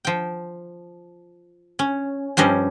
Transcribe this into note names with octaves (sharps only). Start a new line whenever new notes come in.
F3 G5
C#4
G2 F3 G3 C#4 D#5